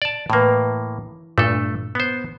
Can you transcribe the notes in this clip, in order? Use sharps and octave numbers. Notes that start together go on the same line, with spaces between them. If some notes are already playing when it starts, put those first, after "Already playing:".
D5 A5
A2 E3 A#3 F5
G2 A#2 A3 A4
B3 C5